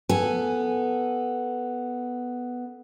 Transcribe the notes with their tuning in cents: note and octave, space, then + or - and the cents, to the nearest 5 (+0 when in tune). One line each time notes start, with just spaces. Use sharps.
B3 +0 A4 +0 G#5 -5